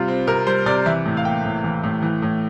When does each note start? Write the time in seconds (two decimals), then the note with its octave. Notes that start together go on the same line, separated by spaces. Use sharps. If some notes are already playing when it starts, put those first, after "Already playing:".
Already playing: C3 G3 F4
0.08 C4
0.27 C3 A#4
0.46 G3 C5
0.66 C3 D5
0.86 E3 E5
1.05 A2
1.17 F5
1.25 A#3 G5
1.45 A2
1.64 E3
1.83 A2
2.02 E3
2.22 A2